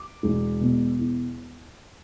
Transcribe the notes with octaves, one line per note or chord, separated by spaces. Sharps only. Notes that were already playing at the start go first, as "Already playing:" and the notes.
Already playing: D6
E1
B2
E2